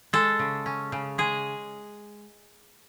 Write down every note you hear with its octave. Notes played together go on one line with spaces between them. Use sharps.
G#3 A4
C#3
C#4
C#3
G#3 G#4